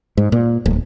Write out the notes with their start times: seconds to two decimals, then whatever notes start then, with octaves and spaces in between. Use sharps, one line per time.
0.17 G#2
0.32 A#2
0.66 D1